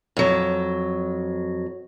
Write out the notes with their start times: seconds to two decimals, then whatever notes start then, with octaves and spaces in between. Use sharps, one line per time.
0.17 F2 F#3